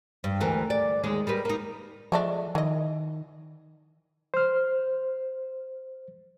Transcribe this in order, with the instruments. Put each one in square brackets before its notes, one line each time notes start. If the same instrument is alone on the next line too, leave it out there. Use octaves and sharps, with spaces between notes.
[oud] G2
D2 E3 A#4
D5
D#2 G#3 G#4
G3 A#4 B4
A#3 D#4
[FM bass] F3 [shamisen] G#3 A3 D4
[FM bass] D#3 [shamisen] E3 D#5
[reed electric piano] C5 F6